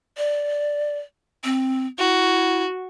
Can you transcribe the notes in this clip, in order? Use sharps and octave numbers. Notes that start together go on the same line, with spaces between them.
D5
C4
E4 F#4